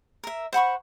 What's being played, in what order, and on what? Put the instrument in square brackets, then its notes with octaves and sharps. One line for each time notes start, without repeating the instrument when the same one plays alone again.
[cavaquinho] A#4 E5
C5 F#5 B5 C#6